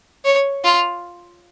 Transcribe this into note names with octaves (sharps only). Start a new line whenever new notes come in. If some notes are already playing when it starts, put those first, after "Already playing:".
C#5
F4